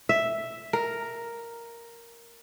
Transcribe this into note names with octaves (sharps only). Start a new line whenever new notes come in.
E5
A#4